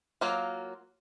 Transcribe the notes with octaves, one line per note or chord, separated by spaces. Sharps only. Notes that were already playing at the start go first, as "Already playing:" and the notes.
F#3 A#3 F4